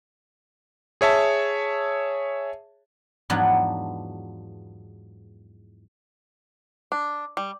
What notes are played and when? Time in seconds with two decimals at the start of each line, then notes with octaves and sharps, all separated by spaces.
1.01 G#4 C#5 E5 A5
3.30 E2 G#2 F3 F#3 B3 D4
6.92 D4
7.37 G3